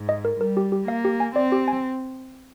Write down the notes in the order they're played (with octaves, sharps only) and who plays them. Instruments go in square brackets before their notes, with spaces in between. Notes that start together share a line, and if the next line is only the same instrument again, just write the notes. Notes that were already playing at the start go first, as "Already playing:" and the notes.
Already playing: [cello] G#2
[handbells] D#5
A#4
[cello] G3 [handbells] A#4
[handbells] G4
G4
[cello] A#3 [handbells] F5
[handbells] G4
G#5
[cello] C4 [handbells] D5
[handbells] G4
G#5